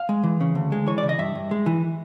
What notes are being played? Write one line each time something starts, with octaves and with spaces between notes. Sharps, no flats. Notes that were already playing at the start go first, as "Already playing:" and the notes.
Already playing: F5
G#3
E3
C#3
D2
G#3
E3 C#5
D5
C#3
D#5
G2 E5
G2
G#3
E3